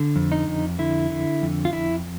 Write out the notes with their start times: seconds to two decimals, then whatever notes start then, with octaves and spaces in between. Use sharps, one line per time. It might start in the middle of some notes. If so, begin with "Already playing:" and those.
Already playing: D3
0.16 F2
0.32 D#4
0.47 F2
0.79 D3 E4
1.10 D3
1.42 F2
1.65 F4
1.73 F2 E4